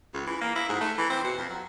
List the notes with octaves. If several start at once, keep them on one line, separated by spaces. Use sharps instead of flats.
C#2
E3
A#3
E4
G#2
A3
E3
C4
B2
F2
F#3